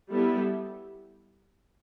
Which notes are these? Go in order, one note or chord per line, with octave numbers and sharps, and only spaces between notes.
G3 B3 E4 A4